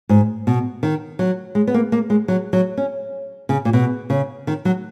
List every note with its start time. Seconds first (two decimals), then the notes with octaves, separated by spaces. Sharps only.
0.09 G#2
0.47 B2
0.83 D#3
1.19 F#3
1.55 G#3
1.67 B3
1.74 A#3
1.92 A#3
2.10 G#3
2.28 F#3
2.53 F#3
2.77 C#4
3.49 C#3
3.65 A#2
3.73 B2
4.10 C#3
4.47 D#3
4.65 F#3